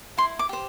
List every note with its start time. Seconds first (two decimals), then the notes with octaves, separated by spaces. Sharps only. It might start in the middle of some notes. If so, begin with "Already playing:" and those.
0.17 E4 C6
0.39 D6
0.49 G4 C5